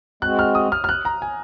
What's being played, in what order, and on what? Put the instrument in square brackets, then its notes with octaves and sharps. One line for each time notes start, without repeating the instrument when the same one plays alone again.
[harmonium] G#3 C4 F#4 [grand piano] F#6
[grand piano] F6
D#6
F6
F6
F#6
A#5
G#5